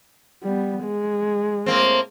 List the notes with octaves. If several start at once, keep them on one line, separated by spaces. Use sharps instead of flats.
G3 B3
G#3
A2 A#3 C4